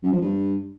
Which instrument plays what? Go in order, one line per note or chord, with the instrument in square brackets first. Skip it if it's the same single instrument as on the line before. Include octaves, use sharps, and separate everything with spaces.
[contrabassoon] F#2
F3
G2